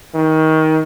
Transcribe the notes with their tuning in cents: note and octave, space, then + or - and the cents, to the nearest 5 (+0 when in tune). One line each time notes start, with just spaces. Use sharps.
D#3 +20